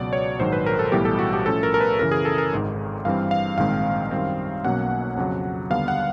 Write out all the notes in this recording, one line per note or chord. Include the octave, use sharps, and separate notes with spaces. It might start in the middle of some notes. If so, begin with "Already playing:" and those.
Already playing: C#2 B2 F#3 D5
C#5
A#1 G#2 D#3 F#3 C5
B4
A#4
A4
B1 A2 E3 G3 B3 G4
A4
F#4
G4
A2 F3 A3 C#4 A4
A#4
A#4
B4
F#2 C#3 E3 A#4
G#4
A4
A#4
G#1 G#2 D#3
G2 E3 G3 C4 F5
F5
A#1 G#2 D#3 G#3 C4 F5
F#2 D#3 G3 C4
B1 B2 F#3 A#3 C#4 F#5
F2 C#3 F#3
D#2 D3 G3 B3 F5
F#5